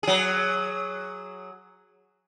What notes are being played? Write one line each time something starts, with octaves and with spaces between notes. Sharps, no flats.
F#3 G#4